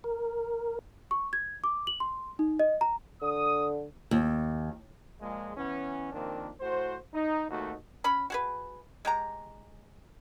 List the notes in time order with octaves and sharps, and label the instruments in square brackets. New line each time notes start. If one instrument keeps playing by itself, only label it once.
[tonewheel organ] A#4
[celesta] C#6
G#6
D6
F#7
C6
D#4
D#5
A#5
[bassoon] D3 [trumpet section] D#6
[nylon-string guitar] D#2
[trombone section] A#2 F3 G#3
E3 B3 C#4
D#3 F3 A#3 C4 D4
A2 F#4 C5
D#4
D#2 B2 A3 D#4 F#4
[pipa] C#4 B5
F#4 G#4 B4
G#3 G4 A#5